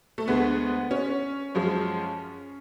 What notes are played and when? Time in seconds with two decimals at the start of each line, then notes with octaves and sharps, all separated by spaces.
0.18 A3
0.28 D2 D3 G#3 B3
0.91 C#4
1.55 F#2 F3 G#3